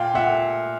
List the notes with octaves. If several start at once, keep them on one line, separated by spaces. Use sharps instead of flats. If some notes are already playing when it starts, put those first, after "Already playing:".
Already playing: A#2 F5 G5
A#2 E5 F#5